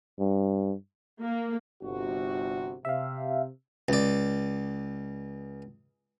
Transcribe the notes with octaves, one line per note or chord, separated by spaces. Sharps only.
G2
A#3
G1 C3 F#4
C3 E5 F5
C#2 D5